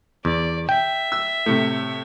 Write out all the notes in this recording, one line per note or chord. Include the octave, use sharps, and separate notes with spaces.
E2 D5
E5 G5
E6
A2 C3